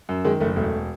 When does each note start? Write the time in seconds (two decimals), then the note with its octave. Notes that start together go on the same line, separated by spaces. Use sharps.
0.09 F#2
0.25 D#3 G#3
0.40 F#1 A3
0.56 E1 A3